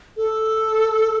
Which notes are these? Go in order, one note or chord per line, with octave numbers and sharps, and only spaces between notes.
A4